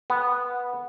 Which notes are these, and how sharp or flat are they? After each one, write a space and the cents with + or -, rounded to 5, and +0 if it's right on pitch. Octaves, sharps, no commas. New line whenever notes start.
B3 -10